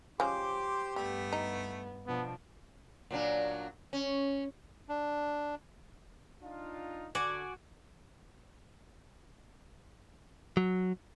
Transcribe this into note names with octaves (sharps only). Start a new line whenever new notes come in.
F3 G#3 C#4 G4 C5 C6 D6
G2 G3 A3 B3
D#4
B2 F3 B3 D4
A#2 F#3 D4
C#4
D4
D4 D#4 F4
D3 F#4 D5 G#5
F#3